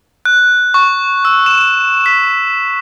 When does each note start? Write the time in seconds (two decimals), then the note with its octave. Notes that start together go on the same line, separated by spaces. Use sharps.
0.25 F#6
0.74 C#6
1.25 E6
1.46 E7
2.06 B6